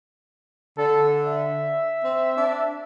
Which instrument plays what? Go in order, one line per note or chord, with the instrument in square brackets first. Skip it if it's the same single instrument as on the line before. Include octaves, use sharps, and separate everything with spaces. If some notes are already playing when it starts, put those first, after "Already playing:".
[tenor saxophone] D3 [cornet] A4
[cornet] E5
[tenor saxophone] C4
D4